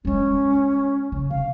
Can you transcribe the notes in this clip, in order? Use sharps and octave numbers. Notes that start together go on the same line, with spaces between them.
G#3 C#4 D4
C#3
C3 F5